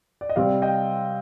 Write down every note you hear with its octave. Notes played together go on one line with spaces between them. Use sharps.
D5
D#5
C3 G3 C4 D5 F5
D#5 G5